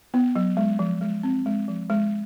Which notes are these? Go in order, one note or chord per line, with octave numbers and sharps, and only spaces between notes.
B3
F#3
G#3
F3
G#3
C4
G#3
F3
G#3